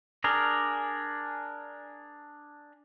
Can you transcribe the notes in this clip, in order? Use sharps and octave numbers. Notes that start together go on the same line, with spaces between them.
D4 G#4 A#4